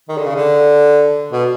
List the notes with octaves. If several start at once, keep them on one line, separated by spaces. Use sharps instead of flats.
D#3
D3
C#3
D3
B2